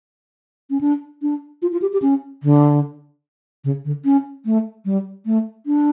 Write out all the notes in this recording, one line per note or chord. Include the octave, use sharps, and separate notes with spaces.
C#4
D4
D4
F4
F4
G4
G4
C#4
D3
C#3
D3
C#4
A3
G3
A3
D4